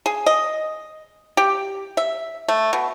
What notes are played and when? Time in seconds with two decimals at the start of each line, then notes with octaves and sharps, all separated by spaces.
0.06 G#4
0.26 D#5
1.37 G4
1.97 E5
2.48 A3
2.73 B2